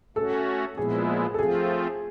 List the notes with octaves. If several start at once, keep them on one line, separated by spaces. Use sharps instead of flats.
A3 C#4 F#4 A4
A#2 F3 G#3 B3 E4 G#4
A4
F3 A3 C4 F4 G#4